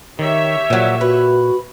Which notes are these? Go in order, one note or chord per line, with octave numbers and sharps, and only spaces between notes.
D#3 G4 C#5 E5
A#2 F3 F#3
F#4 B4